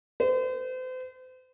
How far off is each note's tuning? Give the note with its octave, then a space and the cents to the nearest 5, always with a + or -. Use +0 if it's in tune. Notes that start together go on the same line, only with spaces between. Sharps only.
C5 -40